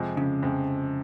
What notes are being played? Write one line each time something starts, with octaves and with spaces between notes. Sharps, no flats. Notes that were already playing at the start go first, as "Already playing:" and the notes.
Already playing: F2 C3 F3 G#3
C#3
F2 C3 F3 G#3